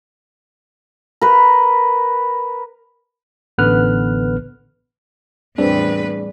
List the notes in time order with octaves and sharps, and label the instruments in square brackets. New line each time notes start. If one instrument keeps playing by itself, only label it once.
[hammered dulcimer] A#4 B4
[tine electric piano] A1 D3 B3 B4 F6 F#6
[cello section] E2 A2 B4 [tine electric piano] G3 G#4 D5 [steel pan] C4 [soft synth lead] D4